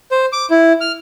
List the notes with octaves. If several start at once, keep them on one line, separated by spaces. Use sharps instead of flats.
C5
D6
E4
F6